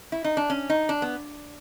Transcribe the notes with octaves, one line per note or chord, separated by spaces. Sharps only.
E4
D#4
D4
C#4
D#4
D4
B3